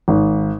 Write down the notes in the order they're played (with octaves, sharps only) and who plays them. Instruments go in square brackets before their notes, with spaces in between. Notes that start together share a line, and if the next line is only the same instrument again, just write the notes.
[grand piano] G#1